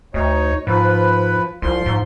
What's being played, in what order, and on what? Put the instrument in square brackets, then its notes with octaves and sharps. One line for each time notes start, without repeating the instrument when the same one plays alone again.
[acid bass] D2 [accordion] D#4 C#5
[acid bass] G#2 [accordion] F3 B4
[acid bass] C2 [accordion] F3 C6
[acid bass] G#2